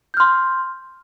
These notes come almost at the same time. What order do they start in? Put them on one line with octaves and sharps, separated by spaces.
G6 F6 C6